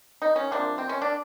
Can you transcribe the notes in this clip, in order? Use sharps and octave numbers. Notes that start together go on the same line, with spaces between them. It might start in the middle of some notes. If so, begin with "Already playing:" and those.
D#4
C#4
C3 F3 A#3 D4
C4
C#4
D4